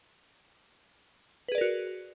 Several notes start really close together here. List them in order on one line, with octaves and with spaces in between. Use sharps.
B4 G#4 D5 A#4 F#4